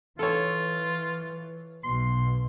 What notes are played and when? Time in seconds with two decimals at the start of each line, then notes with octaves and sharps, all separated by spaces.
0.19 E3 F4 A4 C#5
1.84 B1 B2 C6